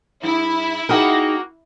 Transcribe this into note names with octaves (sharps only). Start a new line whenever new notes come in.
G2 E4
A#3 D#4 F#4 G#4 A#4 G5